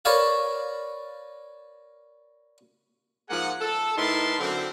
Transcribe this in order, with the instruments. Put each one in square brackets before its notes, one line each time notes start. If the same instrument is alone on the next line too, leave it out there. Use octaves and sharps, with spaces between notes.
[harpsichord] A#4 B4 C#5 D5 F5 A5
[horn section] G#2 F3 A#3 G#4 F#5
A4
A2 D#4 A#4 B4 A5 C6
F#2 D3 C4